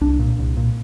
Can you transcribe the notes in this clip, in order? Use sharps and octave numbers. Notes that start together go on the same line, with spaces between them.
C2 D4
A#2
C2
A#2